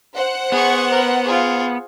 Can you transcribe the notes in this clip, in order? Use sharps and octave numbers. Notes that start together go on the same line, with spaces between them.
C5 F#5
B3 G#4 C#6
A#4 B4
F4 G#4